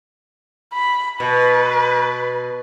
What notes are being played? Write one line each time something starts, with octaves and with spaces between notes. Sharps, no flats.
B5
B2 B4